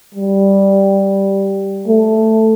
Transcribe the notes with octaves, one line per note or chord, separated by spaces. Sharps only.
G3
A3